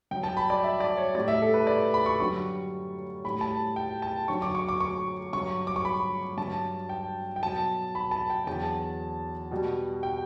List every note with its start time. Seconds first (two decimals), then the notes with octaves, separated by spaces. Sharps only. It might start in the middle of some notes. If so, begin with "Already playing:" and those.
0.11 G2 F#3 G5
0.23 A5
0.37 B5
0.50 D5
0.64 E5
0.80 D5
0.98 C#5
1.15 A2 G3 D5
1.28 E5
1.42 A4
1.54 B4
1.67 D5
1.94 B5
2.06 C#6
2.20 F#2 D3 G3 C#6
3.24 A2 G3 B5
3.41 A5
3.76 G5
4.02 A5
4.28 F#2 D3 F#3 C#6
4.42 D6
4.55 C#6
4.68 D6
4.80 C#6
5.33 G2 F#3 C#6
5.67 D6
5.76 C#6
5.85 B5
6.38 G2 F#3 A5
6.89 G5
7.36 G5
7.42 B2 F#3 A5
7.95 B5
8.11 A5
8.30 G5
8.47 E2 D3 F#3 A5
9.51 B2 G3
10.03 G5